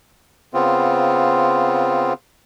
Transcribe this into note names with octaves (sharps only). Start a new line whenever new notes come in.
C#3 B3 C4 F4